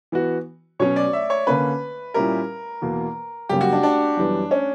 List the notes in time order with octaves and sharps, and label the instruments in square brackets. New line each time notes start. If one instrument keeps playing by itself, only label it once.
[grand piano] E3 B3 F#4
[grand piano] B2 F#3 C#4 [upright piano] C#5
[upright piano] D5
E5
C#5
[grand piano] D3 A#3 C#4 [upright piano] B4
[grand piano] A#2 G3 C#4 E4 G4 [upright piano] A#4
[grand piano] E2 B2 A#3
[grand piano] F#2 C#3 G3 A#3 C#4 [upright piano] G4
[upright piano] F#4
D4
D4
[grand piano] F#2 E3 G3 B3
[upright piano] C#4